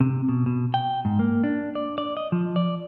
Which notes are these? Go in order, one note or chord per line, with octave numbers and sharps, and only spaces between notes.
C3
B2
B2
G5
G#2
A#3
D4
D5
D5
D#5
F3
D5